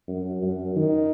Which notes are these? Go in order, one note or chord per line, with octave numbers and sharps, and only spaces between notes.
F#2
F#2
D#3